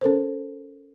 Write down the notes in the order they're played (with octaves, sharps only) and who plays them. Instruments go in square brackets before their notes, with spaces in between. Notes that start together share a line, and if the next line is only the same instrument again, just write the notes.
[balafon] C#4 A4 A#4 C5